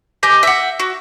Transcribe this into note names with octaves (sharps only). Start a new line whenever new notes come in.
G4 D#5 G#5 G6
E5 F#5
F#4